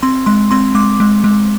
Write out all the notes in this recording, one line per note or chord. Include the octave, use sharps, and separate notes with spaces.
C4 C6
G#3 C6
C4 C6
G#3 D6
G#3
G#3